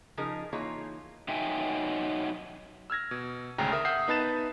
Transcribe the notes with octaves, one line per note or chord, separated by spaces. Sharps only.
C#3 F3 D#4 G#4 A#4
E3 A#3 D#4 F4 G#4 C#5
F#3 D#4 E5 G5 G#5
E6 F6 G#6 A#6
B2
G#1 D2 C#3 G5 A#5
A#4 E5 D#6 F6
E5 F#5 D#6 G6 C7
B3 D#4 B4 A5 A6 E7